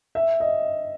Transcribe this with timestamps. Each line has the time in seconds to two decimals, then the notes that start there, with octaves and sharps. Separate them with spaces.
0.15 E5
0.40 D#5